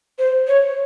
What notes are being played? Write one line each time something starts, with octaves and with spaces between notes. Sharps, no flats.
C5
C#5